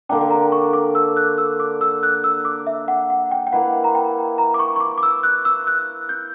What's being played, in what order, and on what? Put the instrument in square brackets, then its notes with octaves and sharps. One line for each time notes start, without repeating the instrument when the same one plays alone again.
[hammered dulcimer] D3 A#3 D4 [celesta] G5
[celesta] G5
A#5
C#6
D6
E6
F#6
E6
D6
E6
F#6
E6
D6
E5
F#5
F#5
G5
G5
[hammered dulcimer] A#3 E4 B4 [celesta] F#5
[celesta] A#5
G5
A#5
D6
C#6
C#6
D6
D6
E6
F#6
E6
F#6
G6